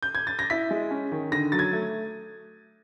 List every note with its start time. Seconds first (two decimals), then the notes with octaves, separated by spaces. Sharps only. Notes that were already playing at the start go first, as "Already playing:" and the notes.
0.03 G6
0.15 G#6
0.27 A6
0.39 A#6
0.50 E4 B6
0.71 G#3
0.91 C#4
1.12 D#3
1.32 D3 A#6
1.52 F#3 A6
1.59 G#6
1.73 A3